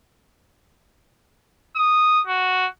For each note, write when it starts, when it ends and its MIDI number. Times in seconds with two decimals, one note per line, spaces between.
1.76 2.22 87
2.27 2.68 66